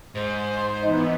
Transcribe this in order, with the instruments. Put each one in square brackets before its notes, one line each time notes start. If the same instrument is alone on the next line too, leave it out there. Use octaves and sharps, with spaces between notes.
[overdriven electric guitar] G#2 [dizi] C5
[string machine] E3 B3 [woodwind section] D#4